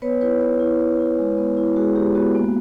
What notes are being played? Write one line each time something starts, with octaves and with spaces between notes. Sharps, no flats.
B3 B4 C#5
E4 B4 C#5
B3 B4 C#5
E4
B3
E4
G#3
B3
E4
G#3 F#4 G#4
G#3 G4
B3 F#4
A#3